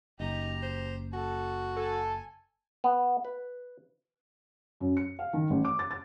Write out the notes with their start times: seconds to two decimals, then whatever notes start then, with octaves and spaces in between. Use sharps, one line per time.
0.20 F#1 D#4 G4 A#5
0.63 C5
1.13 F#4 A4
1.77 A4 G#5
2.84 B3
3.25 B4
4.80 F#2
4.97 C#7
5.19 F5
5.33 D#3
5.50 A1
5.65 D6
5.79 A6
5.91 A6